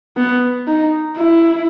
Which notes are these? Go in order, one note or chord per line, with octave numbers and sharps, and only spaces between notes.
B3
D#4
E4